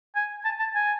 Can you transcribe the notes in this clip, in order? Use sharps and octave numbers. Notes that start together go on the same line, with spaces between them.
G#5
A5
A5
G#5